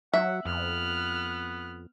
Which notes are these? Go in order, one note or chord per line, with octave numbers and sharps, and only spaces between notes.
F#3 E5 F#5
F2 B3 F6 F#6